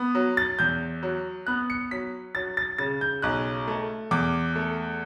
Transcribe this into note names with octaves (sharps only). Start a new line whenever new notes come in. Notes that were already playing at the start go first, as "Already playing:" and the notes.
Already playing: B3
F#3
A6
E2 G6
F#3
B3 F#6
C#7
F#3 B6
F#3 A6
A6
C#3 A6
G6
B1 F#6
A3
E2 D6
A3